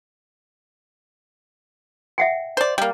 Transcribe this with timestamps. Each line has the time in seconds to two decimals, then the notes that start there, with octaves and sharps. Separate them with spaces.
2.18 E5 F#5 G5
2.57 C5 D5
2.78 G3 A#3